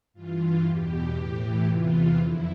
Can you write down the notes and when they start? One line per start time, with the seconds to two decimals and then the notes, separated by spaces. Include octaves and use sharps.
0.14 G2 E3 F4
0.64 E2 B2 G4
1.15 A2 E3 G4
1.66 E2 C3 E3 F4
2.17 F2 D3 E4